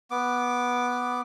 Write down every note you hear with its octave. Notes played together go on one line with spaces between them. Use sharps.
B3 D6